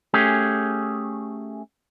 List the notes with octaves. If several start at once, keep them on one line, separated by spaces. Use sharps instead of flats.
A3 C#4 G4 G#4